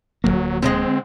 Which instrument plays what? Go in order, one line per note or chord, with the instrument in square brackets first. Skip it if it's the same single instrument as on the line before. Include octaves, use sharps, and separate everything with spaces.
[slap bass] D1 G#1 A#3 [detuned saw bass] F#3
[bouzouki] D3 F3 G#3 [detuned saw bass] C4